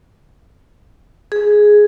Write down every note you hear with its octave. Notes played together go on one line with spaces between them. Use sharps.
G#4